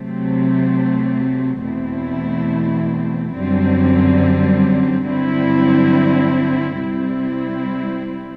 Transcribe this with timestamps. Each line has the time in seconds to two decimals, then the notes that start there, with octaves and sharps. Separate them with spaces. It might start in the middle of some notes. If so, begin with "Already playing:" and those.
Already playing: C3 F#3 A3 C4
1.61 E2 B2 A3 C4 E4
3.34 F#2 D3 G3 C4
5.06 G2 D3 F#3 C4 E4
6.78 C3 G3 C4 E4